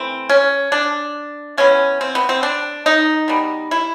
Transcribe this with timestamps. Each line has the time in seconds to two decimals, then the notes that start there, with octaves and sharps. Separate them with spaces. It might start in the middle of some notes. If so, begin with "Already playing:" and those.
Already playing: E3 A3 C4
0.29 C#4
0.72 D4
1.58 E3 G#3 B3 C#4
2.01 C4
2.15 B3
2.29 C4
2.43 D4
2.86 D#4
3.28 B2 G3 B3
3.71 E4